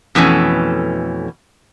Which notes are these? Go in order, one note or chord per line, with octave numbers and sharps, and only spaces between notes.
F2 B2 E3 A3 C#4